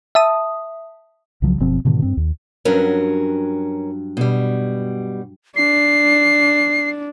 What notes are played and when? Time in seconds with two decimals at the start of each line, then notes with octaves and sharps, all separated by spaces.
0.15 E5 A5 D#6
1.42 C2 C#3 F3 F#3
1.60 F#1 B2 F3 C4
1.85 G#2 B2 D3 D#3
2.02 G2 C4
2.17 D#2
2.65 G2 F#3 C#4 A#4
4.17 B2 G3
5.56 D4 C7